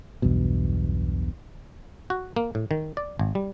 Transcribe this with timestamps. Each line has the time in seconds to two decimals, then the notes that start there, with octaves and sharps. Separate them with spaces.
0.22 B1 E2 G2 B2
2.10 F#4
2.36 A#3
2.55 A2
2.71 D#3
2.97 D5
3.19 G#1
3.35 G3